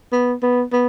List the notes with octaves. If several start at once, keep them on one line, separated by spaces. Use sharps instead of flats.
B3
B3
B3